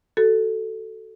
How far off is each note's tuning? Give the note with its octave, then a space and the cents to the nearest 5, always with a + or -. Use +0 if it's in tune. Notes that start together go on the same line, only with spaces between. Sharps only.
F#4 +25 A4 +5